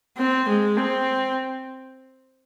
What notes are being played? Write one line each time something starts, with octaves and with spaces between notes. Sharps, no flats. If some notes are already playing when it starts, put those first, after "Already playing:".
C4
G#3
C4